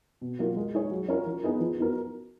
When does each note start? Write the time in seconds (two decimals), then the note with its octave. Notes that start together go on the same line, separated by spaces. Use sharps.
0.21 B2
0.39 F#3 A#3 F4
0.56 G#3
0.74 D#4 G#4 C#5
0.91 F#3
1.08 C#4 F4 A#4 C#5
1.26 F3
1.43 B3 D#4 G#4 B4
1.60 F3
1.79 B3 D#4 F#4 A#4